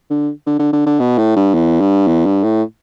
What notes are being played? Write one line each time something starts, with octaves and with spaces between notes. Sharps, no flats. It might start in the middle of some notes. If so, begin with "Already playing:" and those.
D3
D3
D3
D3
D3
B2
A2
G2
E2
G2
E2
G2
A2